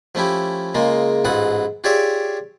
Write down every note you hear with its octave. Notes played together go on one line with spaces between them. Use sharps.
F3 A3 C#4 E4 G4
C#3 G#3 A#3 F4
A1 G#2 E4 F4 F#5 D#6
F4 G4 G#4 C#5 D5 E5